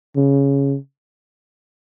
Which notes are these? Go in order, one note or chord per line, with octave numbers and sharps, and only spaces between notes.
C#3